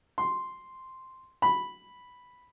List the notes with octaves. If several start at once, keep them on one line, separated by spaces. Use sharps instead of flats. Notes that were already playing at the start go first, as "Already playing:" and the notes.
C6
B5